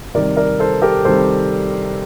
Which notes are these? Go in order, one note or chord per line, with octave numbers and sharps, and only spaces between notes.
C3 D#3 G3 A#4 D5
A#4 D5
A4 C5
G4 A#4
C3 D#3 G3 A4 C5